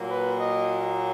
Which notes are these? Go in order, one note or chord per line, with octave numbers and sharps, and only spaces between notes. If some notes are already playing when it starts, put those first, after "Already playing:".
Already playing: A#2 F#3 A#3
B4
D#5